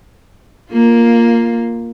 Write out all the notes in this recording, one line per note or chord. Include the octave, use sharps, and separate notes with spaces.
A#3 F4